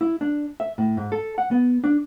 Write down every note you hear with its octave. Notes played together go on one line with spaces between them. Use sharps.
E4
D4
E5
A2
G#2
A4
F#5
B3
D4